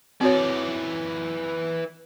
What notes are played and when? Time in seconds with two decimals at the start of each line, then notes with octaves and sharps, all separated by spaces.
0.21 E3 C4 F#4 C#5 D5